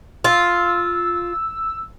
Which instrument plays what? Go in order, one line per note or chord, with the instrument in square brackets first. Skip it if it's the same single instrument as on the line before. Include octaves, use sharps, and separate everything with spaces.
[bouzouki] F4 [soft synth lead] E6